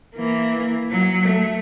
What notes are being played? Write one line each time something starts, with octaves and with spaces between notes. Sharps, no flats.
E3 A#3
F#3
A3